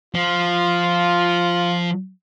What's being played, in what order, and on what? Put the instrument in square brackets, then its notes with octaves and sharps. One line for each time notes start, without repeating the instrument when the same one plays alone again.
[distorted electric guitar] F3 [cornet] F4